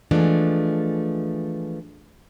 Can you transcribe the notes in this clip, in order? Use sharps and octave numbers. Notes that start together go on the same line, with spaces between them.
E3 F3 G#3 A3 D4